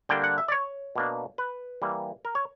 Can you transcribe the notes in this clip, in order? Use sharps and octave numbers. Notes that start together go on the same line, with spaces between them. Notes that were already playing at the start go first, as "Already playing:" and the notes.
D3 G3 A#3 D4 G5
F#5
E5
D5
C#5
B2 A#3 D4
B4
E3 G3 A#3
A#4
C#5